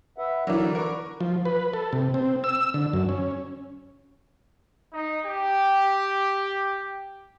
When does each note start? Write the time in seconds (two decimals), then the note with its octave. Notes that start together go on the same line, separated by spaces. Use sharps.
0.18 B4 E5 F#5
0.47 D3 E3 F#3 A#4 D5
0.75 A#4 B4 C#6
1.20 F3
1.45 B4
1.73 A4
1.93 C3
2.14 C4
2.44 E6
2.74 D3
2.93 F#2
3.09 C#4
4.93 D#4
5.26 G4